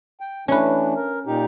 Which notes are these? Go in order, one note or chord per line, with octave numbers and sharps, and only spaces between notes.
G5
E3 A3 C#4 D4 B4
A#4
A#2 D#4 G4